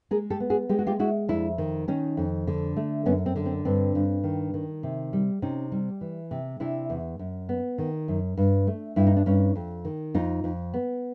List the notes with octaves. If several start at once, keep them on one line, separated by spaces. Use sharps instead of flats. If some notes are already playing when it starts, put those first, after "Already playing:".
G#3 G#4 A#4
G4 A4
B3
F#4 G#4
G#3 G4
F#4
F4 G4
G#3 E4 F#4
F2 D4 E4
D#3
D#3 C#4 D#4
F2
D3
A3
F#2 B3 C#4
C4
D3
C4
G2 C4 D4
G2
D#3
D#3
C3
G3
C3 C#4 D#4
G3
E3
C3
C3 D4 E4
E2
F#2
B3
D#3
F#2
G2
A3
G2 E4
D#4
D4
G2 C#4 D#4
F2
D#3
F2 D#4 F4
F2
B3